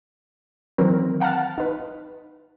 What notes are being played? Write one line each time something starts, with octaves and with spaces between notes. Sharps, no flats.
D#3 E3 F#3 C4 A#4
F5 F#5 A5 F6 A6
D#4 B4